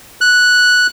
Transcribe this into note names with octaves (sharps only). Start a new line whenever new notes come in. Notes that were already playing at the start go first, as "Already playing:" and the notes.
F#6